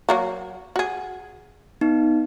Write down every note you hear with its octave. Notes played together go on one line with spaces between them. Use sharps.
F#3 A#3 F#4
F#4 G#4
B3 D#4